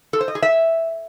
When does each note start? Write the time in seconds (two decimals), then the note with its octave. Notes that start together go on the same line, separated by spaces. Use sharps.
0.13 A4
0.21 C5
0.28 D#5
0.35 G#4
0.42 E5